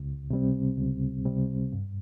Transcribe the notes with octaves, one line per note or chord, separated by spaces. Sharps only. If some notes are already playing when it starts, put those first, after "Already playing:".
Already playing: C#2
C3 G3 C4
C#2
C3 G3 C4
G2